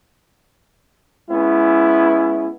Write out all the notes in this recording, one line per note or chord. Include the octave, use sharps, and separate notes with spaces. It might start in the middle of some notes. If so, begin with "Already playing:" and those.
G#3 B3 C#4 E4